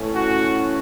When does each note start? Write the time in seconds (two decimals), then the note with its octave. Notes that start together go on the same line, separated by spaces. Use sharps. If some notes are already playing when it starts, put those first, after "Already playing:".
Already playing: A2 E3 A3 C#4
0.16 F#4